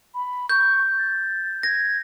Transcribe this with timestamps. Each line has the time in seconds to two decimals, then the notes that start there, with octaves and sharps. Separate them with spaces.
0.14 B5
0.49 C#6 G6
0.98 A6
1.63 G#6 A#6